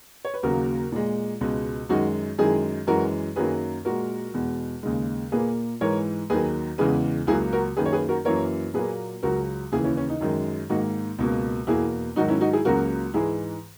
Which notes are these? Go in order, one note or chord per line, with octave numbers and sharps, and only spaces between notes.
C#5
B4
D#2 C#3 F#3 A#3 F#4 A#4
A#2 G#3
C#2 B2 G#3
F#2 D#3 G#3 D#4 F#4
F#2 D#3 G#3 E4 G#4
F#2 E3 G#3 F#4 A#4
F#2 D#3 F#3 A#3 G#4 B4
A#2 G#3 F#4 A#4
E2 B2 G#3
D#2 C#3 G#3
A#2 A#3 G#4 B4
G#2 E3 G#3 A#4 C#5
D#2 D#3 F#3 G#4 B4
E2 C#3 E3 G#3 G#4 B4
C#2 C#3 F#3 A#3 E4 G#4
F#4 A#4
F#2 D#3 A#3 G#4 B4
C#5
G#4 B4
F#4 A#4
F#2 E3 A#3 A#4 C#5
A#2 F#3 A#3 G#4 B4
C#2 C#3 F#3 F#4 A#4
D#2 C#3 E3 E4 G#4
C#4 E4
C#4
D#4
F#2 D#3 G#3
G#2 D#3 A#3 D#4 F#4
C#2 B2 A#3
E2 B2 A#3 E4 G#4
G#2 D#3 F#3 D#4 F#4
C#4 E4
D#4 F#4
E4 G#4
C#2 C#3 F#3 A#3 F#4 A#4
G#2 E3 G#3 E4 G#4